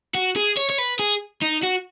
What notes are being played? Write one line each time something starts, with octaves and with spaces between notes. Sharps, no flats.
F#4
G#4
C#5
C#5
B4
G#4
D#4
F#4